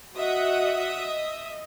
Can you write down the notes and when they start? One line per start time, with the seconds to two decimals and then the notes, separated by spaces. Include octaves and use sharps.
0.17 F#4 D#5 E5 F#5 D#6
0.99 D#5